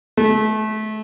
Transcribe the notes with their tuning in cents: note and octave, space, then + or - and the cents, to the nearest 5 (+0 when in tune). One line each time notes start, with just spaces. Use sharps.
A3 -30